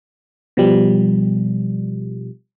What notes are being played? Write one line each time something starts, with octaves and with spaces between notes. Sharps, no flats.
B2 F3 G3